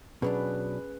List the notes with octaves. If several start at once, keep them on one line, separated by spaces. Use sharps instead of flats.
B2 F#3 C#4 D4 G#4 B4